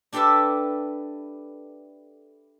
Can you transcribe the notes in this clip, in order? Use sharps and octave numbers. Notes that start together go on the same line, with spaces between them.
D4 G4 A4 B4 D5 E5